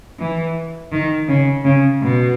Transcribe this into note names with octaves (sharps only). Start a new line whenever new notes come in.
E3
D#3
C#3
C#3
B2